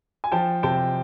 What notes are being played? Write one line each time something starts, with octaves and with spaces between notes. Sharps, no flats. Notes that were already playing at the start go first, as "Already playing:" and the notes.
G#5
F3 G5 A5
C3 G5 A5